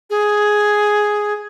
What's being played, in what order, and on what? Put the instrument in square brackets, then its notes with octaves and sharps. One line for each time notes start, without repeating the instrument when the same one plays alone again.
[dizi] G#4